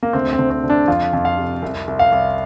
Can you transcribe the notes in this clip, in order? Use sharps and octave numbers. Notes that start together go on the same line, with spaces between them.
A#3
D2 C4
C4
D2
C4
D3
D4
F2 F4
F2
F5
C3
C2
C2
F5
C2